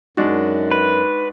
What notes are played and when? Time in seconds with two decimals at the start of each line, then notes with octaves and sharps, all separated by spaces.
0.17 F#2 G#3 D4 D#4 F#4
0.71 B4